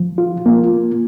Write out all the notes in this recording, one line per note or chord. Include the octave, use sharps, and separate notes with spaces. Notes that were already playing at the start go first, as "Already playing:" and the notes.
Already playing: F3
F4
A#3